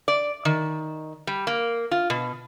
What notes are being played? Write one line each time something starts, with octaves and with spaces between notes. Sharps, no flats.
D5
D#3
G3
A#3
F4
B2